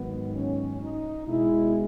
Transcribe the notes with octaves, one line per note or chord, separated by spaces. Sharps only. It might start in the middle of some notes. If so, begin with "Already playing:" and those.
Already playing: G#2 D#3 F#3 B3
C#4
D#4
B2 G#3 E4